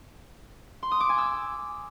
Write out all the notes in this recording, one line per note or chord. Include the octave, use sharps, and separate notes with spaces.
C6
D#6
D6
G#5
E6